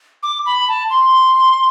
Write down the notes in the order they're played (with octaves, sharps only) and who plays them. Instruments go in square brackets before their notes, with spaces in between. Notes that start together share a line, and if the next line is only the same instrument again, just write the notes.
[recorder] D6
B5
A5
C6